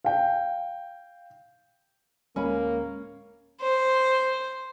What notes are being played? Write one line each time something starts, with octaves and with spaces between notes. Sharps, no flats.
F5 G5
D1 G#3 A#3 C#4 B5
C5